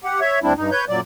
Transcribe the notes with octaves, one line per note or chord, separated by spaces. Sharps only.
G4 F#5
C#5 E5
D2 G3 C4 D4 E4
G2 D#4
B4 C#5 G6
F#2 A#2 F#3 D5